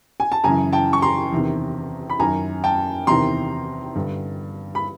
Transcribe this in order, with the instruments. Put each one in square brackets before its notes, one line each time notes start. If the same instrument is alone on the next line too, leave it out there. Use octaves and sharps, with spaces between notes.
[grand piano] G#5
A5
F#2 C#3 E3 G#5 A#5
G5 A5
C#6
A#5 C6
E2 C3 D#3
B5
F#2 D#3 G#5 A#5
G5 A5
E2 C3 D#3 A#5 C6
G2 D3
B5